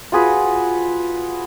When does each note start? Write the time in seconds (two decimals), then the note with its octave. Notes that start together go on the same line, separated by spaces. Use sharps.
0.12 F4 F#4 G#4 B4